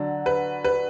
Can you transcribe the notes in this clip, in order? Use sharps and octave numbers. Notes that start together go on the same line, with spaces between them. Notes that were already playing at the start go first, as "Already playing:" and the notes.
Already playing: D3 F#3 D4
B4
B4